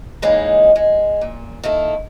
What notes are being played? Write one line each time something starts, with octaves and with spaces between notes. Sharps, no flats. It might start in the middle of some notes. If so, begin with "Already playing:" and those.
D3 E3 G#3 A#3 C#4 D#4
G#3
A#2
D#3 A#3 E4 A4